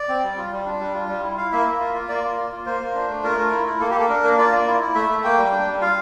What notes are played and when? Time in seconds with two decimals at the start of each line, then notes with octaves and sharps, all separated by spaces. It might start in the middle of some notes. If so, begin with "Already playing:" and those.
Already playing: D5
0.09 C4
0.23 G3
0.37 F4
0.52 G3
0.65 D4
0.80 G3
0.94 F4
1.09 G3
1.23 E4
1.37 E4 F5
1.52 A#3 E5
1.66 A#3
1.80 F4
1.94 F4
2.09 A#3 D5
2.24 A#3
2.37 F4
2.52 F4
2.66 A#3 C5
2.80 A#3
2.95 D4
3.09 A3
3.24 F4 A#4
3.38 A3
3.51 E4
3.66 E4
3.80 A#3 A4
3.90 G4
3.94 A#3 A4
4.09 D4 A#4
4.24 A#3
4.38 F4 D5
4.52 A#3
4.67 E4
4.81 E4
4.95 A3 E5
5.09 A3
5.24 A#3 G5
5.37 G3
5.52 D4
5.66 G3
5.81 F4 F5